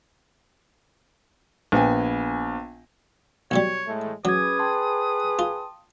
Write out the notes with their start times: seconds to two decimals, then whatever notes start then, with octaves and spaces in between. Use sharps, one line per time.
1.72 A#1 B3 G5 G#5
3.51 B1 B2 G3 C#5
3.86 A2 G#3 A3
4.25 F#3 C#4 G#4 B4 D6 D#6 G#6
4.59 G5 A5 C6
5.39 F4